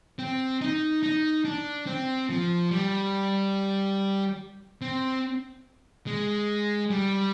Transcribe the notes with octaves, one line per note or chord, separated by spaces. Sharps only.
C4
D#4
D#4
D4
C4
F3
G3
C4
G#3
G3